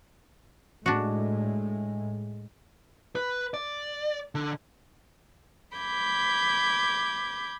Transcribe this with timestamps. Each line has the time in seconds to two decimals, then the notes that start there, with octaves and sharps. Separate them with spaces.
0.86 A2 G#3 D4 F#4
3.16 B4
3.54 D5
4.35 D3
5.75 B5 D6 G6 G#6